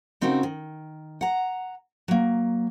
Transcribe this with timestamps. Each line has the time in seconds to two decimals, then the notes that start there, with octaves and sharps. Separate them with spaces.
0.21 C#3 C4 D#4 F#4 A#4
0.43 D#3
1.21 F#5 A#5
2.08 F#3 A#3